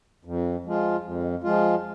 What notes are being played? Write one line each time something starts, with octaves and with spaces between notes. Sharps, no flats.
F2
F3 G#3 F4
F2
F3 G#3 F4